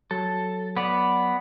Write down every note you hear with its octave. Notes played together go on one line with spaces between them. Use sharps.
F#3 A4
B3 D5